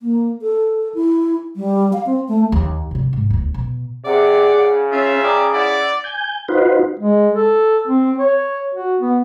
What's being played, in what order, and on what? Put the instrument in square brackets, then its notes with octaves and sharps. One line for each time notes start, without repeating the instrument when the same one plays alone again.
[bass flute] A#3
A4
E4
G3
F5
C4
A3
[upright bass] D#2
C3 G3
G#2
D#1 C#2
B2
[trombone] C3 [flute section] G#4 F#5 [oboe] D5
[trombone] C#3
[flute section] C#4 [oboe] F4 [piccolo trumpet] E5
[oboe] D5 [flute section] G5 A#5 D#6
[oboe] E4 [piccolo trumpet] D5 [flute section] F#5
[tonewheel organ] G#5 G6
D#4 F4 F#4 B4 C5
[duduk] G#3
A4
C4
C#5
F#4
B3